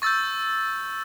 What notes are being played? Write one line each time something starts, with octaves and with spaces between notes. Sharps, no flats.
C#6 E6 G6 A6